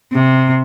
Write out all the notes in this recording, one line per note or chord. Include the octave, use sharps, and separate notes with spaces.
C3